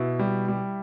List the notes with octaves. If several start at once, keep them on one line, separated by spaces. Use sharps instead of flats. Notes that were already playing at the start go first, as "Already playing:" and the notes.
Already playing: B2 E4
G3
G3